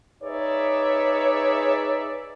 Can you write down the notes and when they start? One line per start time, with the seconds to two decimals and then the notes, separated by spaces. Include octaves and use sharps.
0.23 D#4 G#4 B4 C#5 D5 E5